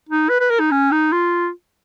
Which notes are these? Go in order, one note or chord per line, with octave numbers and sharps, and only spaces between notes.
D#4
B4
B4
A#4
D#4
C#4
D#4
F4